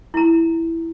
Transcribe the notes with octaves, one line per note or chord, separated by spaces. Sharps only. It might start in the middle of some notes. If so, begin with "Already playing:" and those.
E4 A#5